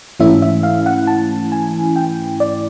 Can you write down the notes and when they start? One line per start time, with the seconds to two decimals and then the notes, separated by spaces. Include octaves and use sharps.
0.20 G#2 E3 A3 C#4 E4 E5
0.42 E5
0.63 F5
0.86 F#5
1.07 A5
1.52 G#5
1.96 G5
2.40 D5